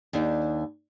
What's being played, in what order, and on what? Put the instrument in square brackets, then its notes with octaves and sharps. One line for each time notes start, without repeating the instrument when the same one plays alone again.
[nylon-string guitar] D#2 D4 D#4